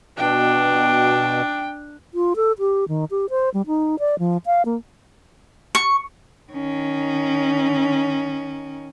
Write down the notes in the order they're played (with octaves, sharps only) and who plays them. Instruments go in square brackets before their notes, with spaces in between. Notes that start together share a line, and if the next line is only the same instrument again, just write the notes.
[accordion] B2 [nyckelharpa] D4 [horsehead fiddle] G5
[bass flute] F4
A4
G4
D#3
G4
C5
G3
D#4
D5
F3
F5
A#3
[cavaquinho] C#6
[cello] D#3 C#4